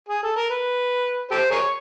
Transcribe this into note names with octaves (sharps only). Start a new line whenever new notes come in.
G#4
A4
A#4
B4
G4 A4 C5
G#4 A#4 C#5